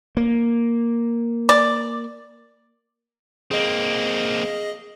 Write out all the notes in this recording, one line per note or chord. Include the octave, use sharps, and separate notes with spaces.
A#3
D5
A#3 C4 G#4 D#5